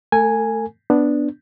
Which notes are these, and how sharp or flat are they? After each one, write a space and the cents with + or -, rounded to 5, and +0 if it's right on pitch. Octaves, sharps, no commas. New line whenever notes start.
A3 -5 A4 +45 G#5 +0
B3 +0 D4 +0